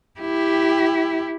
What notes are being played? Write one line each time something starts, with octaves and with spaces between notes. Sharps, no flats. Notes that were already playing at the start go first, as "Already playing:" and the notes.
E4 G4